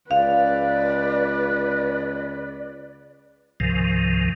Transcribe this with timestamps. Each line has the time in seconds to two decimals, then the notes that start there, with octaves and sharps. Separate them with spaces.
0.11 C#2 B4 D5 F5
3.60 C#2 G#2 C3 D#3 F3